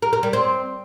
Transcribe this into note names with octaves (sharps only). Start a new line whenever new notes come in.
A#4
A#4
G3
C4